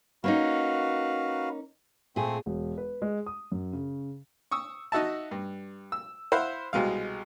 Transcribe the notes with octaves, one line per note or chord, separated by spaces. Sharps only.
A#3 C#4 D#4 F#4 B4 F5
A#2 A3 C4 G#4
E1
B4
G#3
D#6
F#2
C#3
C#6 D#6 E6
D#4 F#4 E5 A5
G2
E6
E4 C5 F5 F#5 B5
C2 B2 G#3 F5